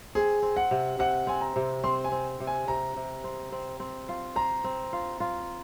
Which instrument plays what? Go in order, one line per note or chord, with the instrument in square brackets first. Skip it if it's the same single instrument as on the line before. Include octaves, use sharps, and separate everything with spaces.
[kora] C4 [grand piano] G#4
[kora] C4
[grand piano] F#5
[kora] C3
[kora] C3 [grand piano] F#5
[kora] C4 [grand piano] G#5
[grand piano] A#5
[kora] C3
[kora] C4 [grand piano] C6
[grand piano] G#5
[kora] C4
C3
[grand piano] G#5
[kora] C3 [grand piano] A#5
[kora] C3
C4
C4
C4
F4
[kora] C5 [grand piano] A#5
[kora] C4
F4
F4